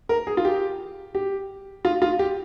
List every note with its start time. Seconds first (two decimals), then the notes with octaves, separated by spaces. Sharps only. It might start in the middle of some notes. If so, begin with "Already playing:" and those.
0.09 A#4
0.27 G#4
0.37 F4
0.45 G4
1.15 G4
1.85 F4
2.02 F4
2.19 G4